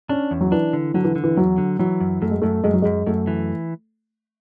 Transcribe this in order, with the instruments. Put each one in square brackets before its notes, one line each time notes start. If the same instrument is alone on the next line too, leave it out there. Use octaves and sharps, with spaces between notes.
[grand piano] C#4 [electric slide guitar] D4
[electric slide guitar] E2
[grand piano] F#3
[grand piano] E3 [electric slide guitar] D4
[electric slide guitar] D3
[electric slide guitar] D3 [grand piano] F#3
[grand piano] E3
[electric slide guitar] D3
[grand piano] E3
[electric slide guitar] E2 [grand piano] F#3
[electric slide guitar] D3
[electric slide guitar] E3 [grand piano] F#3
[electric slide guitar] F#2
[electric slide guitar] F#2 [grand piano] A3
[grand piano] G#3
[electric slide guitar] F#2 [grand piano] A3
[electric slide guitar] F#2 [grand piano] G#3
[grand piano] F#3
[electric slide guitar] F#2 [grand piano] G#3
[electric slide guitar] F#2 [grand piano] A3
[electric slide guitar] E3